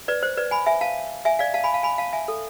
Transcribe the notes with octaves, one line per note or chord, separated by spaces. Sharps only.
B4 D5
C5
B4 D5
G#5 B5
E5 G#5
F5 A5
E5 G#5
D5 F5
F5 A5
G#5 B5
F5 A5
G#5 B5
F5 A5
E5 G#5
A4